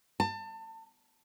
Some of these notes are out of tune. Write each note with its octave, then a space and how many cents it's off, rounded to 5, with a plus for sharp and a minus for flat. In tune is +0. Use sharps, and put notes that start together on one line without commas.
A5 +30